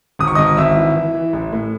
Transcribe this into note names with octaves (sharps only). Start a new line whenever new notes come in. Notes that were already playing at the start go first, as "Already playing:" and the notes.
G#1 D#6
C#6
G#1 D#5 D#6
G#1 E5 E6
E3
E3
E3
A1
A2